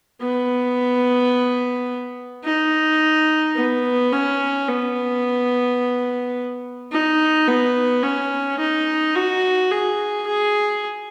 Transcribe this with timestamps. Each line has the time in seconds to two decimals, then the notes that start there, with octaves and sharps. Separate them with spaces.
0.21 B3
2.44 D#4
3.56 B3
4.12 C#4
4.68 B3
6.92 D#4
7.47 B3
8.03 C#4
8.59 D#4
9.15 F#4
9.71 G#4
10.26 G#4